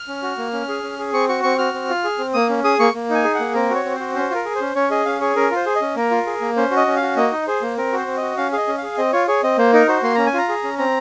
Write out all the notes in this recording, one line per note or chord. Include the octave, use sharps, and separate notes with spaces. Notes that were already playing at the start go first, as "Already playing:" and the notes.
Already playing: F6
C#4
F#4
A#3
C#4
G#4
C#4
G#4
C4 C#6
F#4 C#6
C4 C#6
F#4 F6
C4
F4
G#4
C4
A#3 D#6
C#4
G#4 D#6
A#3 C#6
A#3
D#4 G#5
G#4
F#5
A#3
C4 A#4
F#4 C#5
C4
F#4 C5
C#4 C5
F4 A#4
G#4
C5
C#4
C#4 C#5
G#4 D#5
C#4 F5
G#4 C#5
C#4 A#4
F4
C5
G#4
D#5
C#4
A#3 A#4
F4
G#4
A#3
C#4 C5
F#4
D#5
C#4
F5
F#4
A#3 D#5
D#4
G#4 C5
A#3
C4 A#4
F#4 C5
C4
F#4 D#5
C#4 F5
G#4 D#5 F5
C#4
G#4 F5
C4 D#5
F4 C#5
G#4 C#5
C4 D#5
A#3 C5
D#4 A#4
F#4 C5
A#3 C6
C#4 A#5
G#5
F4 A#5
G#4
C#4
C4 A#5